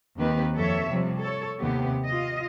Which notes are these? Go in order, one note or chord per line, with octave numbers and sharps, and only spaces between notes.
D#2 D#3 C4 G4 B4
F2 A4 C#5 E5
C3 F3 G3
A4 C#5
D#2 C3 B3 G4
F4 D#5